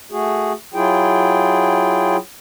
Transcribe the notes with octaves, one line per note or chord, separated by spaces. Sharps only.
A3 F#4 G#4
F#3 E4 F4 G#4 G5